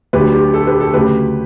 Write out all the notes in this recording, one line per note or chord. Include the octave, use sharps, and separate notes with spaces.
D2 D3 F#3 G4 B4
G4
A4
G4 B4
A4
D2 C#3 F#3 A3 G4 B4